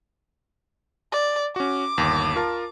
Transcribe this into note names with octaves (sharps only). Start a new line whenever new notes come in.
D5
C#4 F#4 D6
G1 D#2
F4 A#4 A5